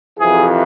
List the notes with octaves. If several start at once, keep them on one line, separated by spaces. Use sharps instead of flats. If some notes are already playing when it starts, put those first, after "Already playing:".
F2 C3 E3 G#4